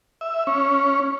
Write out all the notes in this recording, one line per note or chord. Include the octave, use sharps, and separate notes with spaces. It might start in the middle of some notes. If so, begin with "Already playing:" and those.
E5
C#4